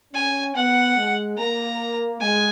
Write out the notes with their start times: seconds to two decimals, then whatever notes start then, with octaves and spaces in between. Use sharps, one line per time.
0.14 C#4 G#5
0.55 B3 F#5
0.97 G#3
1.38 A#3 A#5
2.21 G#3 G#5